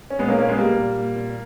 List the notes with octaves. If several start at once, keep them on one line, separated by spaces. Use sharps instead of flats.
C#4
A#2 G#3 B3
A#3 C#4
A#2 A#3 C#4
G#3 B3
A#2 G3 A#3
A#2
A#2
A#2